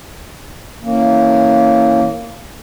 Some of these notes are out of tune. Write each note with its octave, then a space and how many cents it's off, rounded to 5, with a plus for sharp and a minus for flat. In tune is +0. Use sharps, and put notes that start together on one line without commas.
E3 -15 A#3 -10 C#4 -5